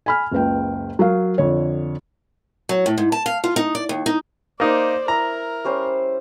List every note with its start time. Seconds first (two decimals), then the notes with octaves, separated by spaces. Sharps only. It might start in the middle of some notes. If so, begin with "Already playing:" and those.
0.06 G#5 B5 F6
0.31 F#1 C#2 B4 G5
0.99 F#3 A#4 F5
1.38 F2 D3 C#5
2.69 F#3
2.86 A2
2.98 G#2
3.12 A5
3.26 F5
3.44 F4
3.56 D#4
3.75 D5
3.89 D#2
4.06 D#4
4.60 A#3 D#4 C5 D5
5.08 E4 A#4 A#5
5.65 G3 C#4 C5